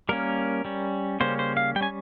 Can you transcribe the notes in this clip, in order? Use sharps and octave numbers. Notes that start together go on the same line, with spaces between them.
G3 A#3 C#4 A#4
G3 C#4
C#3 G3 A#3 C#4 C5
C5
F5
G3 G5
C#4 G#5